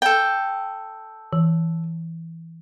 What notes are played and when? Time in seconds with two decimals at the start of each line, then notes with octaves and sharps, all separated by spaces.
0.02 A4 G5
1.33 E3